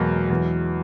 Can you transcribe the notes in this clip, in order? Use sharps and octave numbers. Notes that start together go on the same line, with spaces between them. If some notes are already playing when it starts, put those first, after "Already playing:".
Already playing: E2 B2 F#3 G#3 A#3
E2 E3